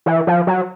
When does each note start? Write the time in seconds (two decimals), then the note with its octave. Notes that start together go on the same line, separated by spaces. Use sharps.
0.06 E3
0.27 F3
0.47 F#3